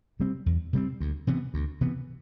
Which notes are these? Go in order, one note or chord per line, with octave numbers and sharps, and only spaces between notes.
C3 G3 C4
E2
C3 G3 C4
D2
C3 E3 B3
D2
C3 E3 B3